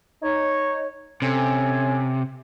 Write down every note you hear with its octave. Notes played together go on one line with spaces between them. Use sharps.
D#4 C#5
C3 C#4 A4 G#5